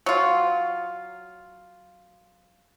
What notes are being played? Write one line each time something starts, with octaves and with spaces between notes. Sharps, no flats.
F#3 F4